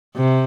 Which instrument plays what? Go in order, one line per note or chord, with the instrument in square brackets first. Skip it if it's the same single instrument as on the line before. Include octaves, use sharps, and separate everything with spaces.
[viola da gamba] C3